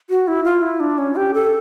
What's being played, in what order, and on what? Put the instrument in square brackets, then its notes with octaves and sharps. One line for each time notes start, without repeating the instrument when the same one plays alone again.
[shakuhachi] F#4
E4
F4
E4
D4
C#4
G4
A4